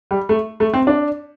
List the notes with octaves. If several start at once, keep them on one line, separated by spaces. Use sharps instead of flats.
G3
A3
A3
C4
D4